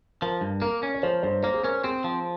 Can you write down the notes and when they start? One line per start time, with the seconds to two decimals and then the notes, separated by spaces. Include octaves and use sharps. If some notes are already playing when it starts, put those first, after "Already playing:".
0.22 F3 A#4
0.41 G2
0.62 A#3 A#4
0.83 C#4
0.94 C#5
1.03 F3 C5
1.23 G2 C5
1.43 A#3 C5
1.54 G#4
1.64 C#4 A#4
1.84 C4 G#4
2.04 F3